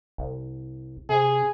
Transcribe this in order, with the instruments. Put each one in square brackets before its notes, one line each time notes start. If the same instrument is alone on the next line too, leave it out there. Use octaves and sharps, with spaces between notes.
[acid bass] C2
[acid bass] C3 [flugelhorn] G#4